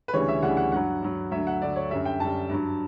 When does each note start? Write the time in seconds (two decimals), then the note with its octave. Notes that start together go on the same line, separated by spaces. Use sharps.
0.08 B4
0.13 D2 C#3 E3 G3 C#5
0.28 E5
0.42 D2 C#3 E3 G3 F#5
0.57 F#5
0.72 G2 F#3 F#5
1.02 G2 F#3
1.31 D2 D3 F#3 E5
1.47 F#5
1.62 D2 D3 F#3 D5
1.76 C#5
1.90 F#2 D3 G3 E5
2.05 G5
2.20 F#2 D3 G3 A5
2.49 G2 F#3